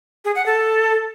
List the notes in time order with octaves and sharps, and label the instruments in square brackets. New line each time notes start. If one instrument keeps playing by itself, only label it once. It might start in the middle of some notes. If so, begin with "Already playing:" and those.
[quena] G#4
F#5
A4